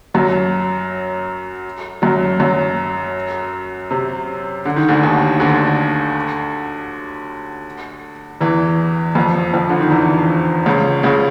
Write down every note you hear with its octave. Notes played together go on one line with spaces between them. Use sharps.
F#2 F#3
F#2 F#3
F#2 F#3
C3
D3
D#3
D2 D3
D#2 D#3
D2 D3
E2 E3
F2 F3
F2 F3
D3
D#3
E2 E3
C#2 C#3
C#2 C#3